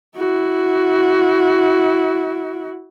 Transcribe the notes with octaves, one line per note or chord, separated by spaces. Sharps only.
E4 F#4